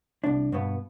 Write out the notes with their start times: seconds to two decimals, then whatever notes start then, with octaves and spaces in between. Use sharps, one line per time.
0.24 C2 D4
0.52 G2 B2 B3